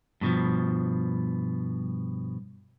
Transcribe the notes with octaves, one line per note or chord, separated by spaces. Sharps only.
G2 B2 D3 F3